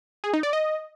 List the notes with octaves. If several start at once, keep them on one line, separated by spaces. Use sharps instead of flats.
G#4
D#4
D5
D#5